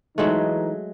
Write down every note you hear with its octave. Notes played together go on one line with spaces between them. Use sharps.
E3 F#3 G#3 A3 D#4